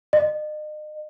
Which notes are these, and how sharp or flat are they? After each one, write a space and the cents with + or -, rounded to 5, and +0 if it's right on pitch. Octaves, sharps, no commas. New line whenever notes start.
D#5 -40